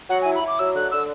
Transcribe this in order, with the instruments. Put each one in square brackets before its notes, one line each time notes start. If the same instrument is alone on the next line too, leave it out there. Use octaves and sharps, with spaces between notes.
[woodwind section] F#3 [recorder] F#5
[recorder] G#5
[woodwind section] E4
[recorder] B5
[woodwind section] E4
[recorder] D6
[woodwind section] F#3 [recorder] E6
[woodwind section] D3 [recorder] F#6
[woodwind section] D3 [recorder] E6